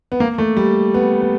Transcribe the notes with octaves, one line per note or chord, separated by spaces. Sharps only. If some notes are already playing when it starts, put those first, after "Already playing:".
B3
A#3
A3
G3
B3
B3